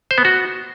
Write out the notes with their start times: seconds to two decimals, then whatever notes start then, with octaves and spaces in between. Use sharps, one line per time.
0.11 C5
0.18 B3
0.25 F#4